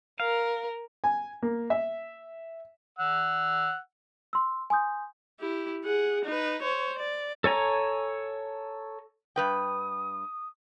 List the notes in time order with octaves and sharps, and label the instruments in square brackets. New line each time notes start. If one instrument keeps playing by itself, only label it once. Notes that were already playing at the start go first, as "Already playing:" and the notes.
[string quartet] A#4 [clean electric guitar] F5
[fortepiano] G#5
A#3
E5
[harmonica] F#5 E6
[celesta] C6 E6
G#5 C6 D#6 G6
[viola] E4 G4
G#4 F#5
D#4 B4
C5 C#5
D5
[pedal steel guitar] A4 C#5 G#5 A#5
[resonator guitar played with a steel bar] G2 B4 G5 [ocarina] D#6